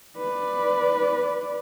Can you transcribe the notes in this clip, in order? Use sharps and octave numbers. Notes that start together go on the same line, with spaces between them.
B4 D5